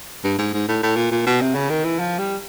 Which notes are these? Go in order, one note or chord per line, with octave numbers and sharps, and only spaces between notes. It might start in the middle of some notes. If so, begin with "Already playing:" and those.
G2
G#2
G#2
A2
A2
A#2
A#2
B2
C3
C#3
D#3
E3
F3
G3